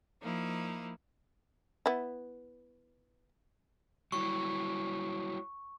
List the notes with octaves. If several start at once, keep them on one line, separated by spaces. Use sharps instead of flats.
F3 A#3 D#4 E4
B3 E4
F#3 G3 E4 C#6